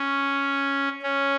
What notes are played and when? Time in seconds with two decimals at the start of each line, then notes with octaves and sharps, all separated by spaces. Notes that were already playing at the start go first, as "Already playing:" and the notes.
Already playing: C#4
1.03 C#4